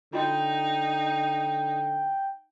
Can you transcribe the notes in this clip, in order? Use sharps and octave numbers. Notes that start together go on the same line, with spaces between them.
D3 D#4 F4 F#4 D#5 G5